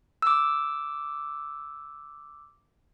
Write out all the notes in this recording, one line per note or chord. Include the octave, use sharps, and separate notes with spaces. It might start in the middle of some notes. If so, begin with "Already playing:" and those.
D6 E6